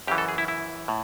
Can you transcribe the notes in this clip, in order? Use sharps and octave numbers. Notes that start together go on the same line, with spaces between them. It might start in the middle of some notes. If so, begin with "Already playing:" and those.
F#2 C#3 E3 G4
A4
G#4
E4
E4
A2